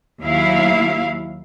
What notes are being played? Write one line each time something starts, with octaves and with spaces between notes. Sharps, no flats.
D#2 F#3 E4 F5